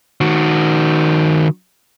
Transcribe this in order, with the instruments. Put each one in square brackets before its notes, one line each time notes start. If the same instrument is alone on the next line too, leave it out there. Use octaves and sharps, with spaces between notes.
[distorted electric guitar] D#3 F#4